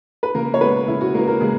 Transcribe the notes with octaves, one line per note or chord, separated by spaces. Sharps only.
B4
C#3 A#3 A#4
C#5
G#3 B3 B4
C#3 E4
F#4
G#3 A#3 B3 A#4
A#3 A#4
C#3 G#3 G#4